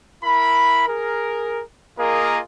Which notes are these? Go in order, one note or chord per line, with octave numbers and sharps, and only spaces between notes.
E4 A#4 B5
G#4 A#4
A#3 F4 G#4 A#4 D#5